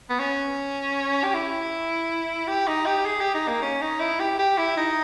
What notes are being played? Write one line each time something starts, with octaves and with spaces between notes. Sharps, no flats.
B3
C#4
G4
E4
G4
D#4
G4
G#4
G4
D#4
A#3
C#4
D#4
E4
G4
G4
E4
D#4